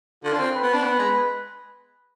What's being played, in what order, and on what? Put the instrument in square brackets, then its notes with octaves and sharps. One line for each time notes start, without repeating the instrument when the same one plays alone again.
[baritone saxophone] D3 [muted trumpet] F4
[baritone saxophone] D4
C4
[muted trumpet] B4
[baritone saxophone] B3
D4
[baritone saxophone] B3 [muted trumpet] B4
[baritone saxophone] G#3